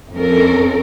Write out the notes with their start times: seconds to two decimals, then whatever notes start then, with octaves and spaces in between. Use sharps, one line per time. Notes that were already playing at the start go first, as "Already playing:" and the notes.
0.13 F2 C4 C#4 A4 A#4